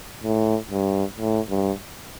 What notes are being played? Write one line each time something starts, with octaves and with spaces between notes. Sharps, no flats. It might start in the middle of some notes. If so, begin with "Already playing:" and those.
A2
G2
A2
G2